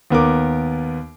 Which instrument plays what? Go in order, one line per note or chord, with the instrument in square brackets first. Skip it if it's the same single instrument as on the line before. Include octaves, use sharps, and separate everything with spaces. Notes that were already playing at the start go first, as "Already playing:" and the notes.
[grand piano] D#2 B3 A#4 D6